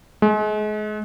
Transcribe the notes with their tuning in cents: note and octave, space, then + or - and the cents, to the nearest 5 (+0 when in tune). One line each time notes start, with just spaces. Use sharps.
G#3 +35